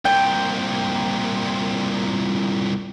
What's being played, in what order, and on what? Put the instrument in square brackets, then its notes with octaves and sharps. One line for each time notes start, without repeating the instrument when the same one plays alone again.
[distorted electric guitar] C2 A#2 [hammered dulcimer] G5